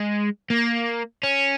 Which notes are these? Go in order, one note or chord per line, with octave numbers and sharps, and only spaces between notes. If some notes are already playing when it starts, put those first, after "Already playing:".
Already playing: G#3
A#3
C#4